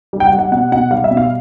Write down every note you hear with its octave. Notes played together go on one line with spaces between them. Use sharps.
G3
G5
F#5
G3
F#5
B2 F#5
B2 F#5
G3 F5
E5
B2
F5